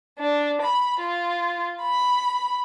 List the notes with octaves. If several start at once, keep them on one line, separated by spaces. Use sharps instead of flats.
D4
B5
F4
B5